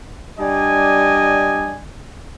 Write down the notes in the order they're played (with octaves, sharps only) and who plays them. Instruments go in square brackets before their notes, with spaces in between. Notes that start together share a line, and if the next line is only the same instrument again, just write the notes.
[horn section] G3 D4 D5 D#5 G#5